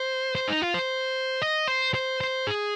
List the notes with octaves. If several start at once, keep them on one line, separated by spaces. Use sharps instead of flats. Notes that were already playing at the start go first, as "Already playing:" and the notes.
Already playing: C5
C5
D#4
F4
C5
D#5
C5
C5
C5
G#4